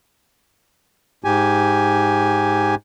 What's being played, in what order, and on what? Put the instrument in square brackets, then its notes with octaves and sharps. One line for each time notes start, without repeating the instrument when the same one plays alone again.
[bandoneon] G#2 G4 G#5